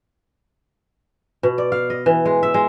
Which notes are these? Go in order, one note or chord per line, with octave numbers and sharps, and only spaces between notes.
B2
D5
F5
D#5
E3
G#3
E5
G#3